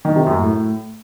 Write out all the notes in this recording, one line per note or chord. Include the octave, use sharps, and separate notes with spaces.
D#3
C3
F#2
A2